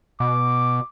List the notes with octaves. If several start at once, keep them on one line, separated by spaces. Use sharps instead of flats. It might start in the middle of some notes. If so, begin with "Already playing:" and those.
B2 D6